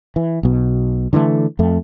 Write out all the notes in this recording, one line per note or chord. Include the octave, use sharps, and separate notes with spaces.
E3
B1 B2
D3 E3 G#3 A3
F2 A3